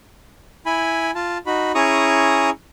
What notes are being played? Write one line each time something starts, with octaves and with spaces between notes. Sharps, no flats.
E4 G#5 B5
F4 A5
D#4 F#4 B5
C#4 E4 G#4 A#5 C#6 D#6